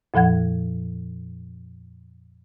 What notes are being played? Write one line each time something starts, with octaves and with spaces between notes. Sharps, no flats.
F2 A#2 F3 F#5 G#6